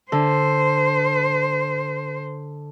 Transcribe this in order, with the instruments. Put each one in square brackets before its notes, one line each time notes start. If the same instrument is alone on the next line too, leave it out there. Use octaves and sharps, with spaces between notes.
[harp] D3 [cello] C5